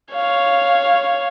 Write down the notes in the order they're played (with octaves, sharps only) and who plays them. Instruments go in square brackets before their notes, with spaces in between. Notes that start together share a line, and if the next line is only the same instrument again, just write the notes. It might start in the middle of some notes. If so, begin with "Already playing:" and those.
[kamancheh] C#5 F5